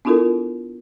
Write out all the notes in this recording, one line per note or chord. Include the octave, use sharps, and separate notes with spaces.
B3 D4 E4 F4 A4 A#4